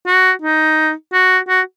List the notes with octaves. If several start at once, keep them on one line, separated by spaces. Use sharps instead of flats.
F#4
D#4
F#4
F#4